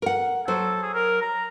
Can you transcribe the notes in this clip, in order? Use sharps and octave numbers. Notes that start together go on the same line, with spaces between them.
A#4 F#5
F#3 A4 C5
G#4
A#4
A#5